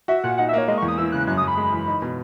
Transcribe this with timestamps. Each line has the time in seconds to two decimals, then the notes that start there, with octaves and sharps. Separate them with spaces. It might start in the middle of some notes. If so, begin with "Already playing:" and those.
0.08 F#4 E5
0.23 A#2 F#5
0.38 D#4 F#5
0.49 E5
0.53 A#3 C#5
0.68 G#3 D#5
0.78 C#6
0.82 E2
0.88 D#6
0.98 E3 E6
1.12 C#3 F#6
1.27 F#2 F#6
1.37 D#6
1.43 F#2 B5
1.57 G#3
1.72 E3
1.87 D#4
2.02 B2